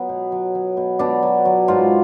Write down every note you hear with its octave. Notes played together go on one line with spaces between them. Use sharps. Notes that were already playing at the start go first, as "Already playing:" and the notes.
Already playing: F#3 B3
B2
F#3
F#3
B2
B2 D4
F#3
F#3
G#2 F4